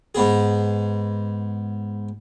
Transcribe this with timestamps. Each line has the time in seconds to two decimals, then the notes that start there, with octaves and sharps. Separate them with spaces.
0.15 G#2 B3 G#4